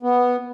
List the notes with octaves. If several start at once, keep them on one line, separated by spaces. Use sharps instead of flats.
B3